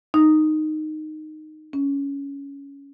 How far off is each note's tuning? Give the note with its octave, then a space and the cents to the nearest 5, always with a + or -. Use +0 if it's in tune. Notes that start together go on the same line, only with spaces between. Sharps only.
D#4 -10
C#4 +15